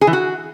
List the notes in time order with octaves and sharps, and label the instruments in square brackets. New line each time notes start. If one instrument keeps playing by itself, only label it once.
[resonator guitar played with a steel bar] G#4
E3
F#4